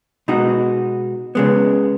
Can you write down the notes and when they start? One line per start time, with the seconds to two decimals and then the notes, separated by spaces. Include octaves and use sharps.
0.28 B2 G#3 D#4 F#4
1.35 C#3 G#3 B3